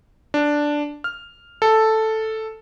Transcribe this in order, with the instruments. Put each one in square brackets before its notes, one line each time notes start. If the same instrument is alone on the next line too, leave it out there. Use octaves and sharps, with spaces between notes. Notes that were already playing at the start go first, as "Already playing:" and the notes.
[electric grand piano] D4
F6
A4